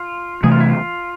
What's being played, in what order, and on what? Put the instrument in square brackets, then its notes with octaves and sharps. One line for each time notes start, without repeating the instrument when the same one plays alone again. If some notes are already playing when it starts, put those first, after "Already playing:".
Already playing: [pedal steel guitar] F4
[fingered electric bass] C3 E3 A3 [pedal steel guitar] G#4
[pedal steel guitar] F4
E4
F4